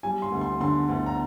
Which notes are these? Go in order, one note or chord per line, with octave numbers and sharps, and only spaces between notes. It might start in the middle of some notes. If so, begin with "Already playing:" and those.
G3 G#5
C6
D2
C6
D3 C6
D2
A#5